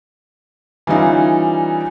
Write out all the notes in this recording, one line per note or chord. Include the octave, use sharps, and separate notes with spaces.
E3 G3 C#4 D#4 F4